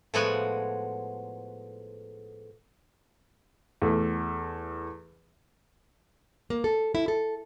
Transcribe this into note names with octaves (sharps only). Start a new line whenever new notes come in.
A2 F3 G#3 B3 F#4 G#5
E2 A3
A#3
A4
E4
A4